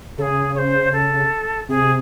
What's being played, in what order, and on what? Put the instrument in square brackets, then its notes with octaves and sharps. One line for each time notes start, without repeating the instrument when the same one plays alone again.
[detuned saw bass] C#3 [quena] G#4 A4
[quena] C#5
C5
A4
[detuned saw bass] C3 [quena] G#4